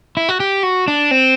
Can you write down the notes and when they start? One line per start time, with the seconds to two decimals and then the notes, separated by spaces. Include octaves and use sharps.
0.17 E4
0.29 F#4
0.40 G4
0.63 F#4
0.88 D4
1.11 C4